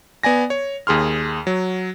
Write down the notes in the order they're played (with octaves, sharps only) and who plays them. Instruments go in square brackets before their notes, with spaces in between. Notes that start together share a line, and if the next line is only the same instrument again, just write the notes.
[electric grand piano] B3 D5 G#5 A#6
C#5
D#2 G#4 C6 F6
F#3